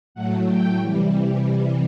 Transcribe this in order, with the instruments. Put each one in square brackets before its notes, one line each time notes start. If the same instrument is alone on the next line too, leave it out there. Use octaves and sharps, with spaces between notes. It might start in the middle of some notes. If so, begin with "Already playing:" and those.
[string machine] A2 F#3 A3 F#5
G5
C3 E3 G3